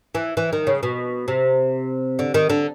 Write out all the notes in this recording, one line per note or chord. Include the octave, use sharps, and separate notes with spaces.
E3
E3
D#3
C#3
B2
C3
D3
D#3
D3